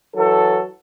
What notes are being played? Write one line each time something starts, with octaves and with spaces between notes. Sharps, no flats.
E3 F#3 A4